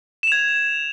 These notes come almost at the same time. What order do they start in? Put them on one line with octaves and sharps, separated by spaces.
E7 F7 G#6